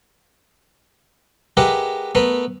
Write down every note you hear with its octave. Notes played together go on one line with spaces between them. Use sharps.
G#3 G4 A#4 B4 E5 F#5
A3 B3 A#4 B4